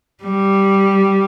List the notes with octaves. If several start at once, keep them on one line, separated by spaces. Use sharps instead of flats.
G3